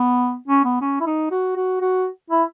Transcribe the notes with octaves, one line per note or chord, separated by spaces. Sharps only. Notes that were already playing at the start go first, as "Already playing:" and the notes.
Already playing: B3
C#4
B3
C#4
E4
D#4
F#4
F#4
F#4
E4